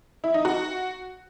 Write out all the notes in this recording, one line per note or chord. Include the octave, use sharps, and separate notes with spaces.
E4
D#4
F#4